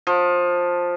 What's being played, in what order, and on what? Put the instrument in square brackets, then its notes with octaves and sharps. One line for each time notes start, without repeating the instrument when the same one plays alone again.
[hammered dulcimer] F3